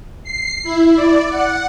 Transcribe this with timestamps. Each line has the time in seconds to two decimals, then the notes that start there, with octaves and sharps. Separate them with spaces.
0.24 C7
0.64 E4
0.96 D5
1.29 F#5